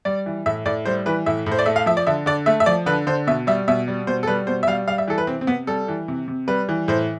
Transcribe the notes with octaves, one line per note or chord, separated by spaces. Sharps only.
G3 D5
E3
A2 E5
A2 D5
G3 C5
E3 B4
A2 E5
A2
C5
D5
A3 E5
F5
F3 E5
D5
D3 E5
D3 D5
A3 E5
E5
F3 D5
D3 B4
D3 C5
B2 E5
G3 E5
B2 E5
G3
B2 C5
A4
G3 B4
B2 C5
E5
G3 F5
G3 F5
E5
E3 A4
B4
C3 C4
C4
C3 B3
G3 A4
E3
C3
C3
G3 B4
E3
A2 C5